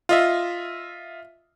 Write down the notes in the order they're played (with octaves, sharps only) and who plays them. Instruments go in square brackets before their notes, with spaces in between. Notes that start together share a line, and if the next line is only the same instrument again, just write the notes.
[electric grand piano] F4 D#5 E5